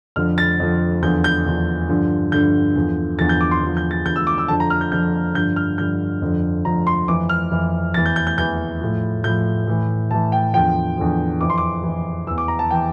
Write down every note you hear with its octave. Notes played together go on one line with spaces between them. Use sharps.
F2 D3 F3 F6
A6
F2 D3 F3
E2 D3 F3 G6
G6
E2 D3 F3
G2 D3 F3
G2 D3 F3 G6
E2 D3 F3
E2 D3 F3 A6
G6
D6
C6
E2 D3 F3
G6
A6
E2 D3 F3 G6
E6
D6
E6
F2 D3 F3 A5
A#5
F6
G6
F2 D3 F3 G6
G2 D3 F3 G6
F6
G2 D3 F3 G6
F2 D3 F3
F2 D3 F3 A#5
C6
F2 E3 D6
F6
F2 E3
E2 E3 A6
G6
G6
G6
E2 E3 G6
A2 F3
A2 F3 G6
A2 E3
A2 E3 A5
G5
E2 D3 F3 G5
E2 D3 F3
F2 E3 D6
C6
D6
F2 E3
E2 E3 E6
D6
A#5
A5
E3 G5